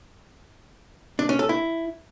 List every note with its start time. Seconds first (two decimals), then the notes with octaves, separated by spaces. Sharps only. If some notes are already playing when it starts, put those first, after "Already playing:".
1.19 D4
1.29 C#4
1.39 A4
1.49 E4